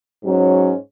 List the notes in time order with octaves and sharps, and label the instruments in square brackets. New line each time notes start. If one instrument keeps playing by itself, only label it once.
[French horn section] G#2 F#3 C#4